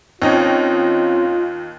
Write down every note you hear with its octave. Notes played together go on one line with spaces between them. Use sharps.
D#2 C4 C#4 D#4 F4 C#5